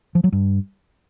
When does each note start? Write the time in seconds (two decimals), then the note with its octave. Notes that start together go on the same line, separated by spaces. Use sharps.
0.15 F3
0.24 F#3
0.32 G2